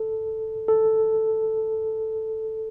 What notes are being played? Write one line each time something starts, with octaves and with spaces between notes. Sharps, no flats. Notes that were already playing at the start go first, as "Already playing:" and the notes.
Already playing: A4
A4